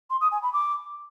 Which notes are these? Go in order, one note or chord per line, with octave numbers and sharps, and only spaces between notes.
C6
D#6
G#5
B5
D6